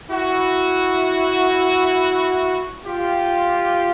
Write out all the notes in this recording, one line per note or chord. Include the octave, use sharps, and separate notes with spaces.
E4 F#4
F4 G4